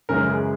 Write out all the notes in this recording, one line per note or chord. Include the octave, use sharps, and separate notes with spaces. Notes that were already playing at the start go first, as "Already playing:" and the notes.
F#2 C#3 E3 G#3 C#4 A#4
G#4